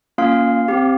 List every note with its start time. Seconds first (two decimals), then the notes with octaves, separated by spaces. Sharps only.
0.18 A#3 C#4 F4 F5
0.68 C4 G4